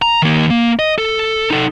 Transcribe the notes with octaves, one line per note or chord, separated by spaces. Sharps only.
A#5
D#3 A#3
A#3
D#5
A4
D#4 A4